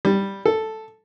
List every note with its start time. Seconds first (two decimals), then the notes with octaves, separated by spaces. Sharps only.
0.05 G3
0.46 A4